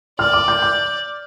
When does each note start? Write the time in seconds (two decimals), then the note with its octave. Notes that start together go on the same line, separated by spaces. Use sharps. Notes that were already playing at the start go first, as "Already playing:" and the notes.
0.19 D5 F6
0.33 D6
0.48 G6
0.62 G6